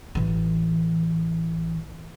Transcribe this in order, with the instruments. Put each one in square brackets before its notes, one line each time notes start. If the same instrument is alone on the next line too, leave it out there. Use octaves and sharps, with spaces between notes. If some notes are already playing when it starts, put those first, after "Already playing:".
[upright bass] A1 E3